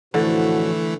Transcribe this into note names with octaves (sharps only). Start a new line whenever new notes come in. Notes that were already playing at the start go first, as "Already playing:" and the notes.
A2 D3 E3 F3 A3 F#4